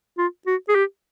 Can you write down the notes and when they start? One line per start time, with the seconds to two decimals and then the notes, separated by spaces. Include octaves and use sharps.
0.18 F4
0.47 F#4
0.69 G#4
0.75 G4